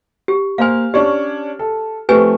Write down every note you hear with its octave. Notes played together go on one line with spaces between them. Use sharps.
G4
A#3 C5 F5 G#5 F6
C#4 D4 G4 C#5
A4
F3 A3 C4 G4 B4 G#5